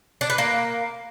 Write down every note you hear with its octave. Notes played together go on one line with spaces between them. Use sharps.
D4
B4
A#3